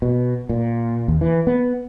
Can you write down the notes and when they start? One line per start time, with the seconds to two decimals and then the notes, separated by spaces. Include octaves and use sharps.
0.02 B2
0.49 A#2
1.08 D#2
1.21 E3
1.47 B3